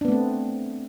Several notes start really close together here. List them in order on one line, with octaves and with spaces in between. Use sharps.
D4 B3 A3 C4